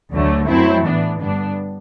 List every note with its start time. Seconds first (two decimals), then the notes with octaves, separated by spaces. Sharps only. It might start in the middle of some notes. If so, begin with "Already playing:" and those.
0.11 D2 D3 F#3 A3
0.47 F#2 F#3 A3 C4 E4
0.83 A2 E3 B3 D4
1.19 G2 D3 G3 B3 D4